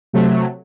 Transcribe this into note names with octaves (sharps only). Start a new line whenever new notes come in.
C3 F#3 A3